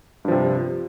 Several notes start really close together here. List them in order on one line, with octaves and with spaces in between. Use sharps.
G2 F3 C3